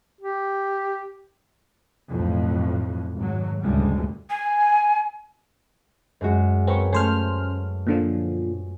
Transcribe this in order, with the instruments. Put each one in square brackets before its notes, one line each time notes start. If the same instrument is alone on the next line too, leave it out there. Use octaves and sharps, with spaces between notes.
[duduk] G4
[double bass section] B1 F2 A2
G#1 F#3
F#1 D2 A2 G3 G#3
[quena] G#5
[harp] F#2 G#3 F#4
[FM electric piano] C4 [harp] A#4 B4 C#5
[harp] A3 G#6 C7 [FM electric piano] C#4 C5 F6
[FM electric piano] A#2 D3 F3